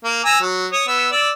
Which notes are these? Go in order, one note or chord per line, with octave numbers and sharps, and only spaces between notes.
A#3
G#5 A#5 E6
F#3
C#5 D#6
B3 E6
D5 E6